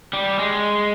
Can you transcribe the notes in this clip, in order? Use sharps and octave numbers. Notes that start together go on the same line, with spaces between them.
G3
G#3